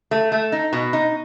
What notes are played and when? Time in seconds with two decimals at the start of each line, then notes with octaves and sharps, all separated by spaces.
0.11 A3
0.32 A3
0.52 D#4
0.73 B2
0.93 D#4